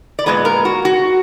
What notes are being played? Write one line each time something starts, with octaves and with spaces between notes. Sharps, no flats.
D5
A#2 G#3 B3 B4
A#4
F#4
F#4